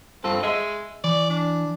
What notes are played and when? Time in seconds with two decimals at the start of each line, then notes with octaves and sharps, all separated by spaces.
0.24 G2 C4 F4 A4
0.43 G#3 D#5 E5
1.04 E3 D5
1.30 D4